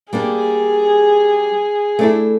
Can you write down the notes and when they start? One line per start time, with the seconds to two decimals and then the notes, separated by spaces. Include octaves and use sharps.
0.13 G3 A#3 D4 G#4
1.99 A3 D4 E4